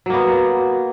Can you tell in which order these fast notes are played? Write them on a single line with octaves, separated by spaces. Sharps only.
F#3 A#3 B3